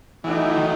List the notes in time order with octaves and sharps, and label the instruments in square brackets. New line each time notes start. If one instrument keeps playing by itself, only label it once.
[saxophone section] B2 F#3 A3 D#4 G4 [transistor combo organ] E3
[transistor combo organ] D#3